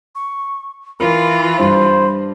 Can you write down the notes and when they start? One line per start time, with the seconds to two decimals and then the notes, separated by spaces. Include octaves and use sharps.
0.15 C#6
1.00 E3 F4 A#4 B5
1.59 G2 C5